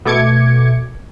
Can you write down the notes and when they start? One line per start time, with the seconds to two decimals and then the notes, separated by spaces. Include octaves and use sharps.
0.05 B2 A3 D6 G#6 C#7